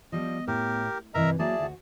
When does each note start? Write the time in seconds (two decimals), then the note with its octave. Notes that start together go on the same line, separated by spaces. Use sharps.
0.12 F3 G3 B3 D#5
0.47 A2 G4 A#4
1.14 G2 C3 E3 A#4 D#5 E5 A#5
1.39 F#3 A#3 G#4 D5 E5 A5
1.59 D2 F#4